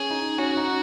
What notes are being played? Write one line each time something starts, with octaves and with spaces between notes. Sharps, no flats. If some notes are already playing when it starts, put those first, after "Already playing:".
Already playing: C#4 G#4
D#4
C#4 F#4
D#4